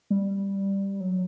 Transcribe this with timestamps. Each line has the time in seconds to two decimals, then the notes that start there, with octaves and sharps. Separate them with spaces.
0.10 G3
1.00 F#3